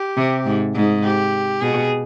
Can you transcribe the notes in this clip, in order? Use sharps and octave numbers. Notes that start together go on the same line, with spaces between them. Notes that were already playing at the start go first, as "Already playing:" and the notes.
Already playing: G4
C3
G#2
G#2
G4
B2 G#4